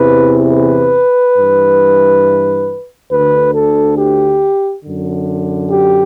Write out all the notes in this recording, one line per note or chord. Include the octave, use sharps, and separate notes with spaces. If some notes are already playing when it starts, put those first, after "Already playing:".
Already playing: E2 C3 E3 B4
B4
G2 E3
D2 D3 B4
A4
G4
F#2 D3
G4